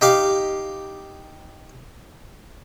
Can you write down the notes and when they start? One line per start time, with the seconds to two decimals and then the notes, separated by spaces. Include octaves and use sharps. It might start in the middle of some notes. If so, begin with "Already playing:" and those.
0.01 D#4 G4 F5